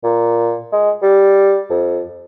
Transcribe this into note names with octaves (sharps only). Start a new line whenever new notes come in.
A#2
G#3
G3
F2